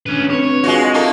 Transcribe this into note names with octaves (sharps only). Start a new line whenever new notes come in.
C#4 D4 B4
C4 B4 C#5
G#3 F4 F#4
A3 A#3 F4